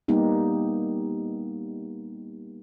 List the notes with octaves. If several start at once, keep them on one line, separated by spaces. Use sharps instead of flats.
G3 A#3 B3 D#4 G4